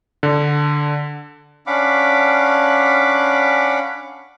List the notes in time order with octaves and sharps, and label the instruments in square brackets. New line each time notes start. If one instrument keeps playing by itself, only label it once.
[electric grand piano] D3
[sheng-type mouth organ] C#4 D4 F5 F#5 B5 D6